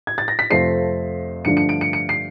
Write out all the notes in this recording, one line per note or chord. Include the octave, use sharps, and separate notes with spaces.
G#6
A6
A#6
B6
F2 C3 F3 A3 C4 C7
G2 D3 F3 A3 D4 C#7
C#7
D7
C#7
C#7
C7